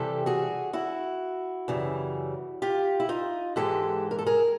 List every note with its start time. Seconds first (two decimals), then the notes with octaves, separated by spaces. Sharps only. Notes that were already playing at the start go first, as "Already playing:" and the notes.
Already playing: C3 E3 G3 G4 A4
0.26 F#4 G#4
0.73 E4 F#4
1.68 F#2 C#3 E3 G3
2.62 F4 G4
3.00 E4
3.09 D#4 F4
3.56 G#2 E3 G#3 G4 A4
4.11 A#4
4.19 A4
4.26 G#4 A#4